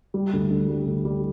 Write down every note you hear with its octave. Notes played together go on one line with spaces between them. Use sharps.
G3
D2
D3
G3
D2
G3